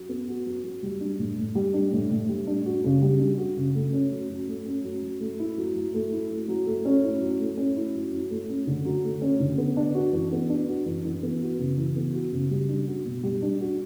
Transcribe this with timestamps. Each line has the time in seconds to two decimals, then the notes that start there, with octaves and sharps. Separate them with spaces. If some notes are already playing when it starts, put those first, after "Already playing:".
Already playing: F#3
0.09 B3
0.28 F#4
0.46 F#3
0.64 F#3
0.83 G3
1.00 D4
1.19 A2
1.38 A2
1.55 G3
1.74 D4
1.93 A2
2.10 A2
2.28 G3
2.47 D4
2.65 F#4
2.84 C#3
3.02 G3
3.20 D4
3.38 F#4
3.56 C#3
3.75 A3
3.93 C#4
4.12 F#3
4.29 F#3
4.48 A3
4.66 C#4
4.84 F#3
5.03 F#3
5.20 A3
5.39 E4
5.58 F#3
5.75 F#3
5.94 A3
6.13 E4
6.30 F#3
6.48 F#3
6.66 A3
6.85 C#4
7.04 E4
7.21 F#3
7.40 A3
7.58 C#4
7.76 E4
7.95 F#3
8.12 F#3
8.30 A3
8.49 C#4
8.67 D3
8.85 F#3
9.04 A3
9.22 C#4
9.40 D3
9.58 B3
9.77 D4
9.95 F#4
10.13 E3
10.32 B3
10.50 D4
10.68 F#4
10.86 E3
11.05 E3
11.23 B3
11.42 F#4
11.59 C#3
11.77 E3
11.96 B3
12.14 F#4
12.32 C#3
12.51 G3
12.69 D4
12.87 F#4
13.05 B2
13.23 G3
13.42 D4
13.60 F#4